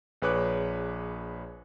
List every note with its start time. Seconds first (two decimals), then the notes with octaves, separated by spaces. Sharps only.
0.22 A#1 G#4 B4 C#5 D6 F#6